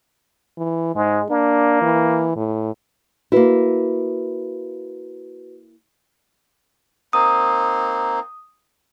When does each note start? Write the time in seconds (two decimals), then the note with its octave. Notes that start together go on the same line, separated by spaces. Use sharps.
0.58 E3
0.95 G#2 G#3
1.30 A#3 D4
1.82 E3
2.36 A2
3.32 A#3 E4 F#4 B4
7.13 A#3 C4 D#4 D#6